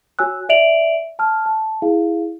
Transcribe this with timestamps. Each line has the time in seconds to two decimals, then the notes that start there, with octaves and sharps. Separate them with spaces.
0.19 F#4 C#5 G#5 E6 F#6
0.49 D5 E5 D7 F7 F#7
1.19 A5 F6
1.46 A5
1.82 E4 G#4 F5